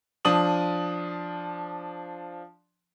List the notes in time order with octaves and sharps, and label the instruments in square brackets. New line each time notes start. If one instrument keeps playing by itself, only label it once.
[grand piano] F3 D4 D#6 F#7